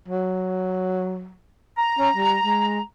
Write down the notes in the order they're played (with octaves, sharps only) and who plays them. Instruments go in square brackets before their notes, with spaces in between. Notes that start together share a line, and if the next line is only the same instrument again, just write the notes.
[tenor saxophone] F#3
[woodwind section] A#5
[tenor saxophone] C#4
G3
G#3